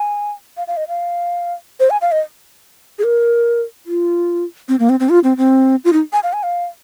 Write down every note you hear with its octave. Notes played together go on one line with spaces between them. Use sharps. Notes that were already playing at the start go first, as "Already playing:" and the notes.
Already playing: G#5
F5
F5
D#5
F5
C5
G#5
F5
D#5
G#4
A#4
F4
C4
A#3
C4
C4
F4
C4
C4
F4
D#4
G#5
F5
G#5
F5